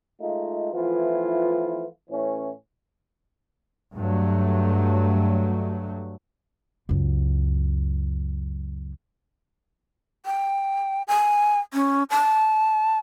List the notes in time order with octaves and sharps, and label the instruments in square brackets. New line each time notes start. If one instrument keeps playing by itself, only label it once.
[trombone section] G#3 A3 D#4 F4
E3 F3 A3 B3 E4 F4
A2 E3 C#4
[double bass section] G2 F#3 A3
[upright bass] C#2 F#2
[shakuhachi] G5
G#5
C#4
A5